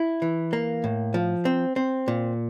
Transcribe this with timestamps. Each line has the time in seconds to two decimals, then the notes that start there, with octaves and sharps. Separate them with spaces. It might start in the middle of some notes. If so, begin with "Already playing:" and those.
Already playing: E4
0.22 E3
0.53 A#3
0.84 A2
1.14 F3
1.45 C4
1.76 C4
2.08 A#2